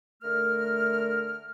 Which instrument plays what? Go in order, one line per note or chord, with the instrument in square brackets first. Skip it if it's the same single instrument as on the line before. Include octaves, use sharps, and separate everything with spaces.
[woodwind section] D3 A3 A#4 F6